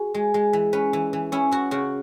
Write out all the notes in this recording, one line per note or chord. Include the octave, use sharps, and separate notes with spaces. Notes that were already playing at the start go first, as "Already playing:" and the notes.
Already playing: F#4 G#4
G#3
G#3
E3
C#4 B4
E3
E3
C#4 E4
E4 F#4
C#3 F#4